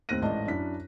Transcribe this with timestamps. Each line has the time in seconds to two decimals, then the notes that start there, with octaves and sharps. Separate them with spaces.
0.09 D#2 A2 C4 F#6 A#6 D#7
0.22 A1 G#2 D5 D#5 A5
0.47 F#2 D4 E4 B6